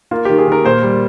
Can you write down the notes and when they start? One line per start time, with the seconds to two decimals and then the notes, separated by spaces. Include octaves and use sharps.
0.11 A#3 F4
0.25 D#3 G4
0.38 G#4
0.47 D#3 A#4
0.65 A#2 C5
0.83 G3